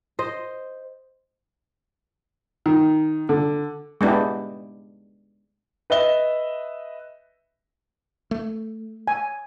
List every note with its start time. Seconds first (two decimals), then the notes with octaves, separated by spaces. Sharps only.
0.19 C5 D#5
2.66 D#3
3.29 D3
4.01 G#3 B3 D4 E4 G4
5.90 B4 D#5 E5 G7
8.31 A3
9.08 G#5